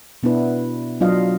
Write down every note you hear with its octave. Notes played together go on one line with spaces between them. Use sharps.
B2 B3 D4 E4 B4
F#3 D4 F4 D#5 F5